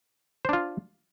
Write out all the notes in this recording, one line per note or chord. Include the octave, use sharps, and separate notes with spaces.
D4 F4 C5